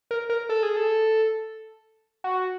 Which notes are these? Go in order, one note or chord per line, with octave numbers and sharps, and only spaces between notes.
A#4
A#4
A4
G#4
A4
F#4